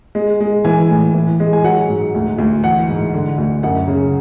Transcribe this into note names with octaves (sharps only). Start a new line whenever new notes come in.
G#3
G#3
E3 G#5
A2
E3
G#3
G#5
F#3 F#5
G#2
D2
D2
E3 F#5
G#2
D3
D2
F#2 F#5
C#3